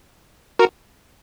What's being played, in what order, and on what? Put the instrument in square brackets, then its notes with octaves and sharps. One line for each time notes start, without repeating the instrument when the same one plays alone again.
[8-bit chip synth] F#4 A#4